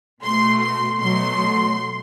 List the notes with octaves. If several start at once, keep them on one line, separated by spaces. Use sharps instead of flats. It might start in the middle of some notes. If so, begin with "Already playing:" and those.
B2 A3 C6
C6
B2 F#3 A3 C6